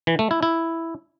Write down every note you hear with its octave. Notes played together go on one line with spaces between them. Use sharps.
E3
A3
E4
E4